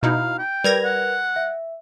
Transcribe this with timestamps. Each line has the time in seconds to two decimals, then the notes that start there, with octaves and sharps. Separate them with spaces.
0.03 B2 D#4 E4 F5
0.38 G5
0.64 G3 A#4 B4 G#6 A#6 F7
0.85 F#5
1.36 E5